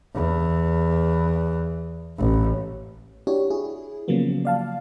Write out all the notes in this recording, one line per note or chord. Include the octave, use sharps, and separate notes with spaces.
E2
A1
D4 E4 F#4 G4 C#5
E4 G#4
C#3 F3 F#3 A#3 B3
D5 F5 A5